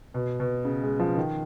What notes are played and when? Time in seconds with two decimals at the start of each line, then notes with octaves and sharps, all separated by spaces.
0.14 B2
0.40 B2
0.65 C#3
0.83 G#3
1.00 F3
1.17 D#3